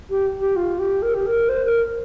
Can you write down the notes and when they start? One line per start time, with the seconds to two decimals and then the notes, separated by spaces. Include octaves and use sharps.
0.10 G4
0.40 G4
0.56 F4
0.79 G4
1.02 A#4
1.14 G4
1.26 A#4
1.49 C5
1.65 A#4